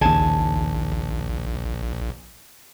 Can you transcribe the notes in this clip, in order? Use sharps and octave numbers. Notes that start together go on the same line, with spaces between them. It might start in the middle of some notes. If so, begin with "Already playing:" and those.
A#1 D#2 C#3 G#5 A5